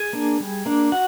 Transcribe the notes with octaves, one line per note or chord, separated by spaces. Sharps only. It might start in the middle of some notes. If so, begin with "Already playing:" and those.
Already playing: G#4 G#5
A#3 D4
G3
A#3 D4
F#4 F#5